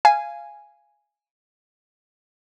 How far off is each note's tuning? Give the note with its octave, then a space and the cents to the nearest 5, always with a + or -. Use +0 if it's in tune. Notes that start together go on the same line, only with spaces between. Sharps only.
F5 -15 G#5 +0